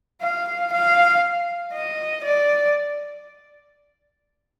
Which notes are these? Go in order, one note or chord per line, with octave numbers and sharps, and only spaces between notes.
F5
F5
D#5
D5